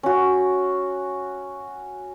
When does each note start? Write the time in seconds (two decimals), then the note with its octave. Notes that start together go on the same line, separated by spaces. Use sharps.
0.03 C#4 F#4